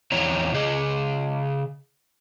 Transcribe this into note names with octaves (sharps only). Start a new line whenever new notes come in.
E2 C4 E4 C#5 A#5
C#3 G#4 D#5